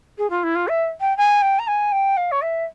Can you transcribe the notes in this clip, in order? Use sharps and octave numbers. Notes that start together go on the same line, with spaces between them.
G#4
F4
E4
F4
E5
G5
G#5
G5
A#5
G#5
G5
F5
C#5
E5